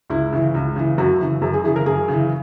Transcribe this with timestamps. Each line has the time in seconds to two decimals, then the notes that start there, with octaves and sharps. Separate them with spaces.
0.10 C#2 E4
0.32 C#3 E3
0.54 C#2
0.76 C#3 E3
0.98 F#2 F#4
1.20 C#3 E3
1.42 F#2 G#4
1.54 G#4
1.64 C#3 E3 G#4
1.76 A#4
1.86 F#2 G#4
2.08 C#3 E3